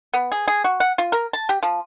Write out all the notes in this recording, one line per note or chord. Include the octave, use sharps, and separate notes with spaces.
B3
G#4
G#4
F#4
F#5
F4
A#4
A5
G4
F3